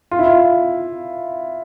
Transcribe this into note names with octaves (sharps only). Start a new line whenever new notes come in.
F4
E4
F4